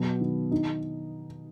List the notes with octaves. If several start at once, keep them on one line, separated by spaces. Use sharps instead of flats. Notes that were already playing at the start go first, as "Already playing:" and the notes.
Already playing: B2 F#3
D#3
D#4